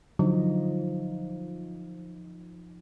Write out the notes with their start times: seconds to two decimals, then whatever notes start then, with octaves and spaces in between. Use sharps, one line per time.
0.19 D3 F3 F#3 D#4 D#5